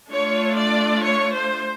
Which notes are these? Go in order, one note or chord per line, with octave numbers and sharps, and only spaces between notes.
A3 D4 F4 C#5
D5
C#5
C5